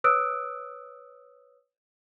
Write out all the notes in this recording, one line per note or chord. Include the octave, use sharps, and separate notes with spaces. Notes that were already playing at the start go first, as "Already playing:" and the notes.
B4 C#5 D#6 E6 F#6 D7